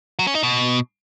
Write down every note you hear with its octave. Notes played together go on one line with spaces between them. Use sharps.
F#3
C#4
D#4
B2